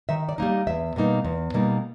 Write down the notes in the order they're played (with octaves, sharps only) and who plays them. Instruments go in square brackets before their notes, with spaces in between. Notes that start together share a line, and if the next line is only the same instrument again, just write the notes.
[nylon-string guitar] D#3 E5
D5
G3 A#3 D#4
E2 E5
B2 G3 A#3 D#4
E2
B2 G3 A#3 D#4